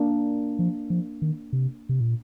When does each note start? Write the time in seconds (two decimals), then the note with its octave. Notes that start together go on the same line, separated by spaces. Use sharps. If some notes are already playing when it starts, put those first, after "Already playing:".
Already playing: A#3 D4
0.59 F3
0.90 F3
1.22 D#3
1.53 C3
1.89 C3
2.00 A#2